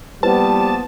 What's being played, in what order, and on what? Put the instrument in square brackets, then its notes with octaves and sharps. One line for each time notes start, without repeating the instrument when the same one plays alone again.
[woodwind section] F3 A#3 B3 [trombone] G3 [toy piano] E4 B4 C5 [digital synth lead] A5